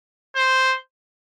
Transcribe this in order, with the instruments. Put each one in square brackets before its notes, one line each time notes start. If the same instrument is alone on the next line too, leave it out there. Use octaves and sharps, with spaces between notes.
[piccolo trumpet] C5